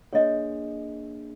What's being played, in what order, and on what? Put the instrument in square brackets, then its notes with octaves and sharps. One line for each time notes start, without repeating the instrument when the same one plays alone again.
[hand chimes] A#3 D4 G#4 [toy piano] C#5 D#5